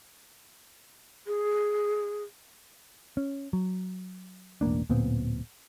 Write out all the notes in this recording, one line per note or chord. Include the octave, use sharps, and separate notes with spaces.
G#4
C#4
F#3
E1 A1 A#3 D4
D1 A#2 B3 C4